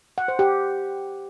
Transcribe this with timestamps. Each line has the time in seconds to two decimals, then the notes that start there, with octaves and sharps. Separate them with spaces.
0.18 F#5
0.28 C5
0.39 G4